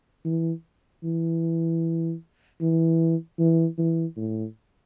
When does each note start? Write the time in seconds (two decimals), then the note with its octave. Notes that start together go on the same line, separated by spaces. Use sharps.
0.25 E3
1.04 E3
2.61 E3
3.39 E3
3.78 E3
4.17 A2